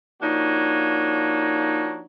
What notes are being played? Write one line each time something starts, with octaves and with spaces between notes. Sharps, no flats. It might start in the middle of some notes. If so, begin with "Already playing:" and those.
F3 A#3 D4 D#4 F#4 C#5